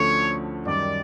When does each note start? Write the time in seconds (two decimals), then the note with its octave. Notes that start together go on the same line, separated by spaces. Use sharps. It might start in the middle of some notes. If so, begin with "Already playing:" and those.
Already playing: D2 D3 F3 A3 C#4 C#5
0.65 F#2 D#3 G3 D5